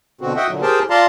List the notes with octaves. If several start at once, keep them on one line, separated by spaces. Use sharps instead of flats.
B2 D3 C4 F#4
F#4 D#5 E5 F#5 G5
A#2 D3 F#3
G4 G#4 A#4 C5 G5 A5
F4 D5 F5 A5 A#5 C6